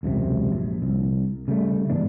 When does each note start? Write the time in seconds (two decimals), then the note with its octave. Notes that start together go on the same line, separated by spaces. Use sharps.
0.03 E1 C#2 F#2 C3
0.52 A#1
0.82 C2
1.48 C#3 G3 A3
1.90 G#2 E3 B3 D4